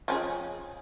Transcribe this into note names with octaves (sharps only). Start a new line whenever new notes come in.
F3 C#4 G#4